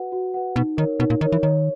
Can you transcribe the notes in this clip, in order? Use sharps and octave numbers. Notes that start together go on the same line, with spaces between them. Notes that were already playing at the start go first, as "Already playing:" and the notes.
Already playing: F#4 B4 F#5
F#4
B4 F#5
B2 D#4
D#3 A#4 C#5
B2 D#4
A#2
D#3 A#4 C#5
E3
D#3 C#5